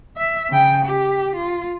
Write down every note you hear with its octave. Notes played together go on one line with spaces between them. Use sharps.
E5
C#3 G5
G4
F4